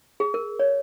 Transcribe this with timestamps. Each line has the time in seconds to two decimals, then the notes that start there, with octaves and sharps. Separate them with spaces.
0.20 G#4
0.34 A#4
0.59 C#5